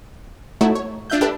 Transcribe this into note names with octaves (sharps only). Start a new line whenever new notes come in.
A3 D#4 E4 F#4 A4 C#5
C#5
D4 F4 E5 F#6 G6
D4 G4 A4 B4 E5